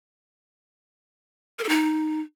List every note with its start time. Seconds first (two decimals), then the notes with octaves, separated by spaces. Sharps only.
1.59 A#4
1.64 A4
1.69 D#4